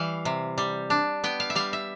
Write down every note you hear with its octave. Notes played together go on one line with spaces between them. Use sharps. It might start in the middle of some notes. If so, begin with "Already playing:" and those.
Already playing: E3 G3 F5
C3
G3
D4
B3 G5
F5
E5
G3 F5
E5